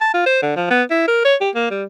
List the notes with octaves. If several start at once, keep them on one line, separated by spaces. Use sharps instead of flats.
A5
F4
C5
D3
F3
B3
E4
A#4
C#5
G4
A#3
G3